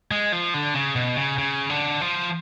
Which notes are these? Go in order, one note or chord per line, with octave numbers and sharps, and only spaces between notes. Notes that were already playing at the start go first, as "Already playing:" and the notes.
G#3
F3
D3
C#3
B2
C#3
C#3
D3
F3